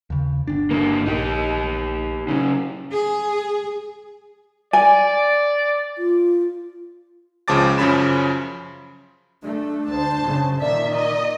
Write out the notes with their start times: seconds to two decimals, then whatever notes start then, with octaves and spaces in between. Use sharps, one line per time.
0.10 D#2 C#3
0.47 G1 D4
0.71 D3 A#3
1.06 A#1 D#4 G4
2.28 C#3 F#3
2.92 G#4
4.73 D5 G#5
5.98 F4
7.48 C#2 C#3 F3 A5 D6 A6
7.78 F#2 C#3 F3 C#4 B5 E7
9.42 A3 D4
9.89 D2 C5 A5
10.23 F#2 C#3
10.60 A#2 D#3 A#3 D5 E5
10.94 D#5